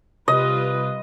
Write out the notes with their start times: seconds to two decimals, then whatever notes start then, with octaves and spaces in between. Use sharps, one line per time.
0.28 C3 G3 F4 B4 D#5